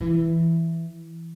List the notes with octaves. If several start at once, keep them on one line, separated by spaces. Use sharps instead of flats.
E3